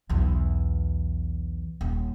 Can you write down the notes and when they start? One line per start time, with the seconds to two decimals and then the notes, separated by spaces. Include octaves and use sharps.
0.09 B1 E2
1.81 D#1